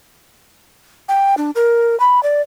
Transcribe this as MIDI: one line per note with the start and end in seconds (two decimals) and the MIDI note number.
1.09 1.35 79
1.37 1.51 62
1.55 1.98 70
2.00 2.22 83
2.23 2.41 74